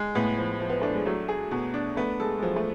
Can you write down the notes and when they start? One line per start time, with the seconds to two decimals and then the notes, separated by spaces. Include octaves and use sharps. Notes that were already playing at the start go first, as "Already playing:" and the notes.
Already playing: G#3
0.15 A2 B3
0.38 F3
0.60 F3
0.69 B3
0.81 A3 D4
0.94 G#3
1.06 F#3 A3
1.29 G#4
1.51 B2
1.74 D4
1.97 A3 B3
2.20 G#3 A4
2.37 G#3
2.42 F3 F#3
2.56 A3